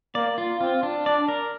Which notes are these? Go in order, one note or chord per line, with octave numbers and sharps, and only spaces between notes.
A#3 D5
F4
C4 F4
D4
D4 D5
A#4